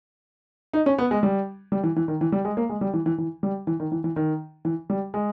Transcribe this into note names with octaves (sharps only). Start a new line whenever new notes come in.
D#4
C#4
B3
G#3
G3
G3
E3
E3
D#3
E3
G3
G#3
A#3
G#3
G3
E3
E3
E3
G3
E3
D#3
E3
E3
D#3
E3
G3
G#3